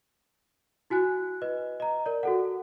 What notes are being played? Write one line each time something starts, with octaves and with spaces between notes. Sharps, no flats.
E4 F#4 G#5 F#6
B4 D#5
D#5 A#5
A#4 D5
F#4 A4 F#5